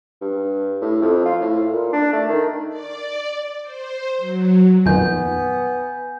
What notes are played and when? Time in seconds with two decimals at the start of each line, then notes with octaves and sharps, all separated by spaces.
0.22 G2
0.81 A2
1.02 F2
1.26 F4
1.41 A2
1.73 A#2
1.93 D4
2.13 A3
2.29 D#3
2.69 D5
3.62 C5
4.18 F#3
4.86 F2 A#2 D#3 B3 G#5 G6